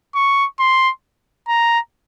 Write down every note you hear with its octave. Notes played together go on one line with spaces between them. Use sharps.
C#6
C6
A#5